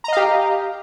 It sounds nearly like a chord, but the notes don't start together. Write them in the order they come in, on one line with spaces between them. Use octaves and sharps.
A#5 D#5 F5 G4